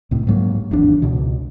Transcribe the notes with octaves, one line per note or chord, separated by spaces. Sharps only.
C2 A2
G#2 F#3 A#3
G#1 E2 D4
C#2 B2